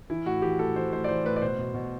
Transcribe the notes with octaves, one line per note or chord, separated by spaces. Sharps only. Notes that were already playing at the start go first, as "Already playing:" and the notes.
E3 E4
A2 F#4
E3 G4
A2 A4
E3 C5
A2 C5
D5
E3 C5
A2 B4
D5
B2 C5
B2
B2